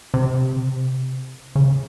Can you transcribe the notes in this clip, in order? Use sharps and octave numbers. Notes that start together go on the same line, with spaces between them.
C3
C#3